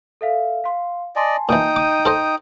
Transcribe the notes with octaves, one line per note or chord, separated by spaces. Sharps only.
A4 E5 F5
F5 C6
D5 D#5 G#5 A5 C6
A#2 E3 D#4 G5 D#6
D6 D#7
A4 C5 D#5